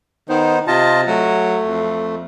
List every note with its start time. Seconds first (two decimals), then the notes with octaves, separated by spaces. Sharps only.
0.29 D#3 B3 D#4 C5
0.67 C3 F4 D#5 A5
1.07 F#3 A3
1.66 F2